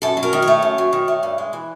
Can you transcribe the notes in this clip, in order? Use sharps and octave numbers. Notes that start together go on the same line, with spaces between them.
F#2 A4
F#3
A#4
D#3
C#5
A3
F#2
F#3
D#3
A3
G2
G#3
E3